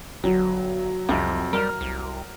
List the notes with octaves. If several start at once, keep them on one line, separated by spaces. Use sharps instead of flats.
G1 F#3
C2 F2 C3
G3 A#4
C2